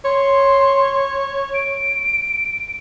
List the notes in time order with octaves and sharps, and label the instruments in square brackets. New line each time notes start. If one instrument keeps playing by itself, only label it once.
[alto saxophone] C#5 [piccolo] C6
[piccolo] D7